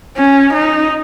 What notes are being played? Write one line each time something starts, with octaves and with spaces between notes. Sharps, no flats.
C#4
D#4